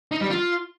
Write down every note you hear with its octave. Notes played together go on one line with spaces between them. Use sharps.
D#4
G3
F4